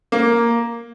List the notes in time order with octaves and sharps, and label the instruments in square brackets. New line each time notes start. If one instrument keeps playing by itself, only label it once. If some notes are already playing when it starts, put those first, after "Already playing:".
[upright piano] A#3